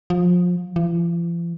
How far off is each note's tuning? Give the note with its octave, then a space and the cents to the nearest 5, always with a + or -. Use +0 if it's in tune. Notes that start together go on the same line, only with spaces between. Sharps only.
F3 +25
F3 -45